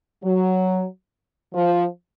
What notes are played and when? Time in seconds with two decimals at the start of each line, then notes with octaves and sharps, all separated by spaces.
0.23 F#3
1.53 F3